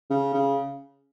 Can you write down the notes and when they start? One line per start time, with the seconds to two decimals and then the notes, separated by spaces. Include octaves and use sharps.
0.10 C#3
0.34 C#3